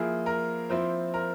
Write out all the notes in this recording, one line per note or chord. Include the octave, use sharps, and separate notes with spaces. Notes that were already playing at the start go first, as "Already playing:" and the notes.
Already playing: F3 A#3 E4 G#4
A#4
F3 C4 E4 C5
A#4